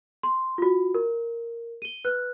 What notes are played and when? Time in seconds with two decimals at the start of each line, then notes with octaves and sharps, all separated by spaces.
0.23 C6
0.58 F4 F#4
0.94 A#4
1.82 D#7 G7
2.05 B4 F6 F#6